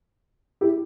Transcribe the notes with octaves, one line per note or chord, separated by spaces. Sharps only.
E4 G4